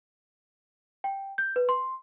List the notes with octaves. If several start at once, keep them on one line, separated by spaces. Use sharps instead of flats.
G5
G6
B4
C6